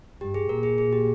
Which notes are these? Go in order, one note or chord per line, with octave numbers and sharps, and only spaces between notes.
G2 G4
G#4
A#2 A#4
G#4
G#4
G4